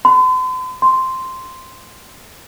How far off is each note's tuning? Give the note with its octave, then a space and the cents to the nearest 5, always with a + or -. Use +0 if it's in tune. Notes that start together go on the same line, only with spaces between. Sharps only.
C6 -45
C6 -5